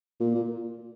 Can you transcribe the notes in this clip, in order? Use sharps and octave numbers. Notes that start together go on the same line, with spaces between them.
A#2
A#2